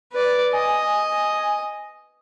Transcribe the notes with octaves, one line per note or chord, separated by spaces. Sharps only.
B4 D5
D#5 G#5